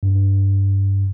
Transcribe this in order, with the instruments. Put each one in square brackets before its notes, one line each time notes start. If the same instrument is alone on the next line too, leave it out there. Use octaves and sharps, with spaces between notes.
[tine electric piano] G2